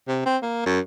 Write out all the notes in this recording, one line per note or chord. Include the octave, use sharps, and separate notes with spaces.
C3
C4
A#3
F#2